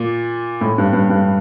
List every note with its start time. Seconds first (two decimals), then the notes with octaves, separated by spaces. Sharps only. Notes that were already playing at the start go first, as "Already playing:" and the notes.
Already playing: A#2
0.61 A2
0.78 G2
0.93 G2
1.10 G2